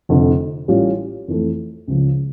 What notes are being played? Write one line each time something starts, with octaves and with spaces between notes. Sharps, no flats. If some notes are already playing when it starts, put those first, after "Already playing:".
F1 F2 D3
A1 A2 G3 C#4 F4
F2 E3 A3
C#2 C#3 F3